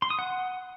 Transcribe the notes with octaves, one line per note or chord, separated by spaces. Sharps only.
C6
D#6
F#5